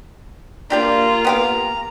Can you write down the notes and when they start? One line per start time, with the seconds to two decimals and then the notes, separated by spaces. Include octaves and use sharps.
0.70 A#3 D4 F4 G4 D5 A#5
1.25 B3 G4 F5